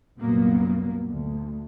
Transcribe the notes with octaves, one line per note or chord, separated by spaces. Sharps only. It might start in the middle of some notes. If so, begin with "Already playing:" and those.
C2 F#2 A#2 F#3 A#3 B3
D2